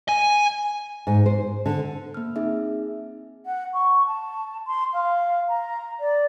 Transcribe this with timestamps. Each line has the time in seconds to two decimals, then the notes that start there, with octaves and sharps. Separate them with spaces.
0.09 G#5
1.07 G#2
1.26 C5
1.66 D3
2.14 A#3 F6
2.36 C4 D#4 G#4 E5
3.45 F#5
3.73 C#6
4.06 A5
4.67 C6
4.93 F5
5.48 A#5
5.99 D5